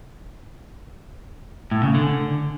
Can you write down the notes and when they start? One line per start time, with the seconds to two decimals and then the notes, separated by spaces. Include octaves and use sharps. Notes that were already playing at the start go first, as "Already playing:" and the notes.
1.71 A2
1.83 C#3
1.95 D3